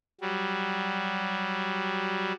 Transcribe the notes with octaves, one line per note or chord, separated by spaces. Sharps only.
F#3 G3